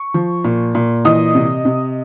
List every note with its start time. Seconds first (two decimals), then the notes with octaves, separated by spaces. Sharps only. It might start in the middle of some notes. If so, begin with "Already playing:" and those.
Already playing: C#6
0.14 F3
0.44 A#2
0.75 A#2
1.05 E3 D#5 D#6
1.35 C3
1.65 C3